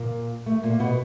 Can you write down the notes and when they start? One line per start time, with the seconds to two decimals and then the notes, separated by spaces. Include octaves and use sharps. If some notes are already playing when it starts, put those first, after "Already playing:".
Already playing: A#2 A#3
0.46 A3
0.63 A#2 A#3
0.80 B2 B3